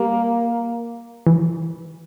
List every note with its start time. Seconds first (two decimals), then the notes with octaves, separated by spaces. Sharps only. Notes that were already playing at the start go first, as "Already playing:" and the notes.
Already playing: G3 A#3
1.27 E3